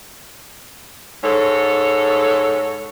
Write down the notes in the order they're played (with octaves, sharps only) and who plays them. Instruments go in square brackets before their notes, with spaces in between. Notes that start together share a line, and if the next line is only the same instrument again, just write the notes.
[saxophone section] G#2 A4 C#5